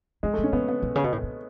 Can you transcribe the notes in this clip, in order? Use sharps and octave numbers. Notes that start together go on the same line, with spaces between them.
F#2 G#3
A3
B2
C#4
C#3 B3
B3
B2
C#3
B2
A2
C#3